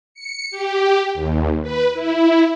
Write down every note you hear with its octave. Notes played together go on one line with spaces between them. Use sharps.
C#7
G4
D#2
B4
E4